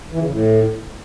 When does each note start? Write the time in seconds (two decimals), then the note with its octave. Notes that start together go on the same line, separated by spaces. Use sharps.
0.12 E3
0.20 C#3
0.29 A2